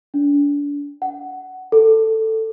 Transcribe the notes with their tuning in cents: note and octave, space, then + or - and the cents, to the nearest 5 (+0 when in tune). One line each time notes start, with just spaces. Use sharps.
D4 -35
F#5 +15
A4 +10